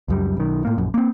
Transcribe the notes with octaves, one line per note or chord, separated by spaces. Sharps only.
C#2 F#2 G3
B1 D#3
A2 A#3
A#1 F#2
A#3 C4